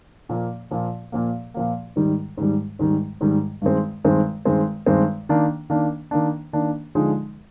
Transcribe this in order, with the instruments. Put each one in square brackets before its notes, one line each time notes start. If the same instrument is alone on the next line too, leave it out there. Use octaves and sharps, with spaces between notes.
[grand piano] A#2 F3 A#3
A#2 F3 A#3
A#2 F3 A#3
A#2 F3 A#3
G#2 D#3 G3
G#2 D#3 G3
G#2 D#3 G3
G#2 D#3 G3
G2 D#3 G#3 C4
G2 D#3 G#3 C4
G2 D#3 G#3 C4
G2 D#3 G#3 C4
D#3 A#3 D4
D#3 A#3 D4
D#3 A#3 D4
D#3 A#3 D4
D3 F3 G#3 D#4